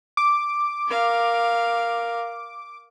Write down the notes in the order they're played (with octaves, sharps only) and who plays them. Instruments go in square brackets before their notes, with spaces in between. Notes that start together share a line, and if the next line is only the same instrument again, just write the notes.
[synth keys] D6
[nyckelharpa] A#4 F5